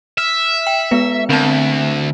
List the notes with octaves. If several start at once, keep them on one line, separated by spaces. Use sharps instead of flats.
E5 F6
G5
G#3 B3 B4
D2 C4 A5